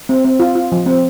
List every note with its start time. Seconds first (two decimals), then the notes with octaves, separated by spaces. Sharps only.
0.09 C4
0.25 C4
0.40 F4
0.55 F4
0.72 F3
0.86 C4